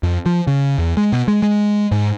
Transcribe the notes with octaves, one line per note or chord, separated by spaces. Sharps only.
F2
F3
C#3
E2
G#3
B2
G#3
G#3
G#2